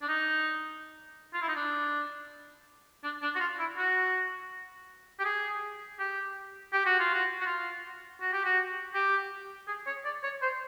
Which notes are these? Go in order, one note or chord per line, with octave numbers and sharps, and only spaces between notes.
D4
D#4
F4
E4
D#4
D4
D4
D4
F#4
F4
E4
F#4
G4
G#4
G4
G4
F#4
F4
F#4
F#4
F4
F#4
G4
F#4
G4
G#4
C#5
D5
C#5
C5